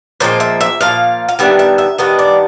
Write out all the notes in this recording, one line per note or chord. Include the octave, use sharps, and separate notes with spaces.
A#2 F3 G#3 C4 C5
E5
E5
A#2 F3 F5
F5
D#3 G3 B3 D4 E5
E5
E5
D#3 G3 B3 D4 D#5
D5